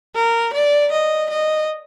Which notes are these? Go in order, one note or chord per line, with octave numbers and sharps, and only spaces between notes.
A#4
D5
D#5
D#5